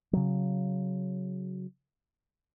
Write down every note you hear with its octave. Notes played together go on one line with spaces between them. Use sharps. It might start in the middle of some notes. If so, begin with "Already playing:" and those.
C#3 F#3